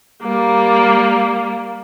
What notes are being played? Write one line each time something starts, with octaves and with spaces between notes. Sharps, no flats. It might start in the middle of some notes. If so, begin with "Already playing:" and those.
G3 A#3